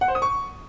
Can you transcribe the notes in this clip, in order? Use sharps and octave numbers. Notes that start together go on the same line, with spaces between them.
F#5
C5
D#6
C#6